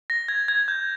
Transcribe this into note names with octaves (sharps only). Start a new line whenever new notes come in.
A#6
G#6
G#6
G6